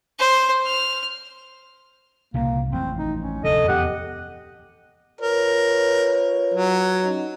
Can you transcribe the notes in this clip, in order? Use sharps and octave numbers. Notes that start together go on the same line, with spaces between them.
C5
F6
C2 A#2 C#3 A#3
A1 F2 C4
D#4
C#4
F1 D2 D3 A4 D#5
E2 A3 B3 G4 F#5
F4 A#4 B4 C#5
F#3
C#4 D#4